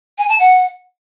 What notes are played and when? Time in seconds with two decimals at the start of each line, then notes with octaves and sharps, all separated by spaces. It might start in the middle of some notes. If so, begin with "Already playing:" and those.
0.18 G#5
0.29 A5
0.39 F#5